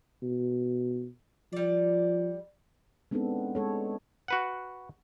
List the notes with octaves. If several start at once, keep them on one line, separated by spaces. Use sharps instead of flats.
B2
F3 G3 D5
G#3 B3 C4 D4 D#4 A4
G#3 A4 C#5
F#4 B4 F#5